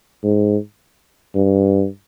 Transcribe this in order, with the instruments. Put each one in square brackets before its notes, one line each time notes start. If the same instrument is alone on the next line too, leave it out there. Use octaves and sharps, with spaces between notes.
[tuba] G#2
G2